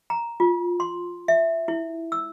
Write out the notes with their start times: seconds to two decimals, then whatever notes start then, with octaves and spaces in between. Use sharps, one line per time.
0.10 A#5
0.40 F4
0.80 C6
1.28 E5
1.68 E4
2.12 E6